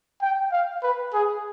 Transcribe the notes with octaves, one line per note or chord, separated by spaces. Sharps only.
G5
F5
B4
G#4